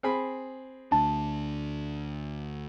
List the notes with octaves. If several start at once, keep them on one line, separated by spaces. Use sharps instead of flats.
C4 G#4 B5
D2 D4 A5